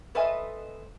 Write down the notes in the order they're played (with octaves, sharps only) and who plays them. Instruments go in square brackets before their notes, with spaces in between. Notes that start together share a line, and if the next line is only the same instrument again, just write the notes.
[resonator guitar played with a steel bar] A4 B4 C5 D#5 E5 G#5